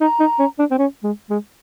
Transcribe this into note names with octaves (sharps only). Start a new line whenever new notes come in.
D#4 A#5
D#4
C#4
D4
C4
C#4
G#3
G#3